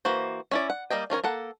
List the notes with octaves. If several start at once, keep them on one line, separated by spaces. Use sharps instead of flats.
E3 A#3 F#4 C5
C#4 E4 D5
F#5
G3 A#3 D#5 G5
F3 C#4 A#4 C#5
A#3 A4 F#5